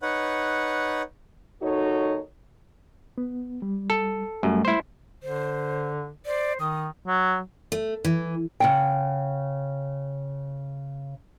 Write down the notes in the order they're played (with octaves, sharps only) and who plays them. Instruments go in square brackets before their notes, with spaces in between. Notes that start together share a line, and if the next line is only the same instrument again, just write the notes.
[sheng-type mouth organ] D#4 B4 C#5 F#5
[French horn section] D#2 D#4 F#4 A4 C#5
[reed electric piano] B3
G3
[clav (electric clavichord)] A4
[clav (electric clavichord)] F#2 [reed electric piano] G3 A3
[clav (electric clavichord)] E4 C5
[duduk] D3 [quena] C5
[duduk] C5 [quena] D5
[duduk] D#3 [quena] D#6
[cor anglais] F#3
[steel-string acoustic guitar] A3
E3
[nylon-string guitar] C#3 F#5 G5